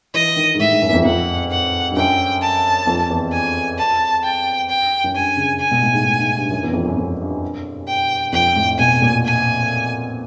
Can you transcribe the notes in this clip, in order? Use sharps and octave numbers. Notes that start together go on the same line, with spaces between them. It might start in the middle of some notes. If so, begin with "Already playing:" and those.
E3 D#5
D#3
G#2
A2 E5
G#2
F#2
E2
F2
F2 F#5
F#5
G2
F#2 G5
A5
F2
E2
G#5
A5
G5
G5
F#2
G2 G#5
C#3
G#5
B2
A2
G#2
A2
G#2
G2
F#2
E2
F2
F#2
F2
G2
G5
F2 G5
A2
B2 G#5
A#2
G#5